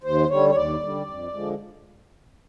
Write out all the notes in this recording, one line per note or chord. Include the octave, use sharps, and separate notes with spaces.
D#2 C5
D3 G3 C#5
C#5
D#2 D5
D3 G3
F2
D3 F3 G#3